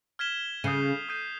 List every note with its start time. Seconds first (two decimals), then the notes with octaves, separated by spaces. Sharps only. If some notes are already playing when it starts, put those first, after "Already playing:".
0.19 F6 G#6 B6 E7 G7
0.64 C#3 D#6 G6 C7 D#7
1.09 D#6 G6 C7 D#7